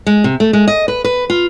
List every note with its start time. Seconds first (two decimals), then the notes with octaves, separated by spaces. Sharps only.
0.07 G#3
0.24 C3
0.40 A3
0.53 G#3
0.68 D#5
0.88 B4
1.04 B4
1.30 F4